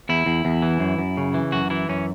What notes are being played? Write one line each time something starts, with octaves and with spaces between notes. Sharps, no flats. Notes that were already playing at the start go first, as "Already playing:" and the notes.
E2 E4
E2
E2
E3
F#2
F#2
C#3
E3
F#2 F#4
E3 E4
F#2 C#4